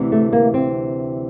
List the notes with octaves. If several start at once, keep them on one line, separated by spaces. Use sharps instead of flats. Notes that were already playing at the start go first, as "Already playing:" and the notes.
Already playing: D2 C3 E3
A3
A#3
C4